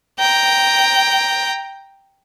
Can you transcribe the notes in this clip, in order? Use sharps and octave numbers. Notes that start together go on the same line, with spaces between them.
G5 A#5